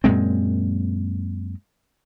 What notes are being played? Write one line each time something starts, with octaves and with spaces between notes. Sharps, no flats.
F#2 A#2 G#3 C4